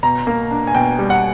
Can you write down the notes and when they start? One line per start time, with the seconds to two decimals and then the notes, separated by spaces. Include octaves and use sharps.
0.03 B2 A#5
0.27 A#3
0.51 D4
0.67 G#5
0.75 B2 G5
0.99 G3
1.10 F#5